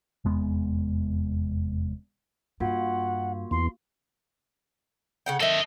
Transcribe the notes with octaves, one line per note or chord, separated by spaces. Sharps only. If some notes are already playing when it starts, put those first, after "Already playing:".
F1 E2 G#3 B3
G2 A#3 F4 F#4 F#5
E2 C6
C#3 F#5 G5
D#3 A4 D#5 E5